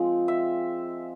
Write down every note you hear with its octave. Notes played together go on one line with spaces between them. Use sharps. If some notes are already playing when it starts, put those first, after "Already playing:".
Already playing: F3 G#3 C4
E5